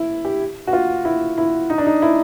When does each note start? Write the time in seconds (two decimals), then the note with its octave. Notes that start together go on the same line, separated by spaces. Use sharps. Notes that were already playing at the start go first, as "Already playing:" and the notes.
Already playing: E4
0.25 G4
0.67 F#4
0.73 F4
1.05 E4
1.38 E4
1.70 D#4
1.78 D4
1.86 D#4
2.02 E4